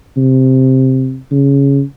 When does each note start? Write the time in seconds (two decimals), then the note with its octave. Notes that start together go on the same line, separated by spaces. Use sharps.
0.17 C3
1.31 C#3